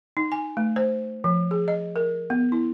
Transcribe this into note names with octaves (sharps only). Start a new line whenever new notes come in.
D#4
G#5
A3
C5
F3
G#4
D#5
A#4
B3
E4